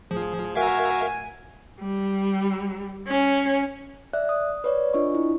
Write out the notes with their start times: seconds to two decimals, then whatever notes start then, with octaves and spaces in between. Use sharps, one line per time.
0.11 D1 F3 G#4
0.55 F#4 A#4 E5 F5 G#5
1.81 G3
3.07 C#4
4.13 D5 E5 F#6
4.29 D#6
4.64 B4 C#5 D5
4.93 D4 F4 D#5 C#6
5.15 E4